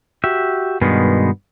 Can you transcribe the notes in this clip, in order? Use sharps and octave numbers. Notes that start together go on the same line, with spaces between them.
F#4 G4 E5
G2 B2 D#3 G#3 B3